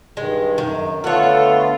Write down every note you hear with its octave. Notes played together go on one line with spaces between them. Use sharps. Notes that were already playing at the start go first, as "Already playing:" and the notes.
G2 D#3 G#3
F#2 D#3
D3 A3 B3 F4 A4 C#5 F#5